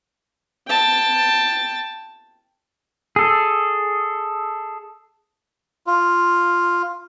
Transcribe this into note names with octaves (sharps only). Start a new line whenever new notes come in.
G5 A5
G#4 A4
F4